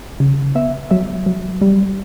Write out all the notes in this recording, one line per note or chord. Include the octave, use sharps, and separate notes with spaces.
C#3
B3 E5
F#3 E5
F#3
G3